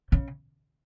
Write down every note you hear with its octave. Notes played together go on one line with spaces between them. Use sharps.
C#3